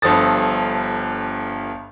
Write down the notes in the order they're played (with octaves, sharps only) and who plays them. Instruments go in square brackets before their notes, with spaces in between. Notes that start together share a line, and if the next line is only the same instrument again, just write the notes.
[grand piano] G1 G2 F3 A4 D#6 A6